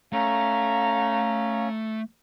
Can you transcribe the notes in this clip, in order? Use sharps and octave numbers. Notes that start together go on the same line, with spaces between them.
A3 C#4 F5 A#5